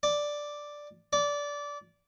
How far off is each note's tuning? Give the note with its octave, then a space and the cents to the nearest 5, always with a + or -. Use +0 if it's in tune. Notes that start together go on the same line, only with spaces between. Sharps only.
D5 +0
D5 -20